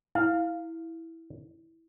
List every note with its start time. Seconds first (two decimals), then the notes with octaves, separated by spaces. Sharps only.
0.15 E4 F5